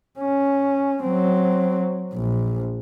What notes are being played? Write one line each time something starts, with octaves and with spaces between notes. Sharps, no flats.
C#4
F#3 C4
A#1